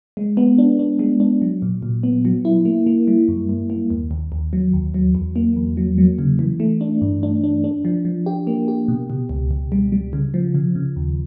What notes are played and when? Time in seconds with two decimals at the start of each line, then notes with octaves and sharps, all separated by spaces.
0.17 G#3
0.37 B3
0.58 D4
0.79 D4
0.99 G#3
1.20 D4
1.42 F#3
1.62 A#2
1.83 A#2
2.03 B3
2.25 F#3
2.45 E4
2.65 A#3
2.86 A#3
3.08 G3
3.28 F#2
3.49 F#2
3.70 A#3
3.90 D#2
4.11 D#2
4.32 D#2
4.53 F#3
4.73 D#2
4.94 F#3
5.15 E2
5.36 A#3
5.56 E2
5.77 F#3
5.98 F#3
6.19 C#3
6.39 E3
6.60 A3
6.81 D4
7.02 G2
7.23 D4
7.44 D4
7.64 D4
7.85 F3
8.05 F3
8.26 G4
8.47 A#3
8.68 G4
8.88 B2
9.10 B2
9.29 C#2
9.51 C#2
9.72 G3
9.92 G3
10.13 C#3
10.34 F3
10.54 C#3
10.75 C#3
10.96 D#2